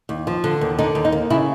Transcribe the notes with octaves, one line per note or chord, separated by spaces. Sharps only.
D#2
F3
D3
D#2
D3 D#4
D#2
D#4
A#3
C#3 E4